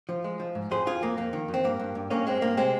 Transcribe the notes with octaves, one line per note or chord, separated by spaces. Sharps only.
F3
G#3
F3
G#2
F2 G#4 C5
F2 F4 G#4
F2 A#3
F2 A#3
D#3
F2
C4
G2 A#3
G2
G2
G2 A#3 C#4
G2 G#3 C4
G2 A#3
C3 G#3 C4